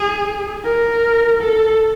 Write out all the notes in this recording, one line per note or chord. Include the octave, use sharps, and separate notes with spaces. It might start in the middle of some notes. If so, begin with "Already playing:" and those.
Already playing: G#4
A#4
A4